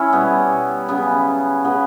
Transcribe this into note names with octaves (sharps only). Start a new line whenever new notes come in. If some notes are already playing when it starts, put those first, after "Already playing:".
Already playing: C#4 E4
B2 G3 B3
C#3 F#3 B3
C#3 F#3 B3